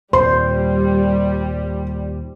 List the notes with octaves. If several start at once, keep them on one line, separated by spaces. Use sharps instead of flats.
D#2 A#2 G3 C5 C6